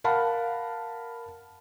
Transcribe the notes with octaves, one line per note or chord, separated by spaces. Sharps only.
A#4 F5 F#5 A5 B5